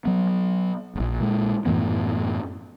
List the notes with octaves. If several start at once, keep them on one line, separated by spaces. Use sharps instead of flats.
F#3 B3
D1 A#1
A#2 G#3
F#2 A2 E3 B3